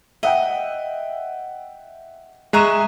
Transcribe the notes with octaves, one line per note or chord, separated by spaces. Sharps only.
D#5 E5 F#5 G5
G#3 E5 A#5 C#6 F#6 D#7 E7